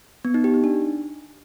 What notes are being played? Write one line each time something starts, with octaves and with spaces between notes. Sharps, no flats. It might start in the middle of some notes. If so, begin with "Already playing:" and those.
B3
D#4
G4
D#4
D4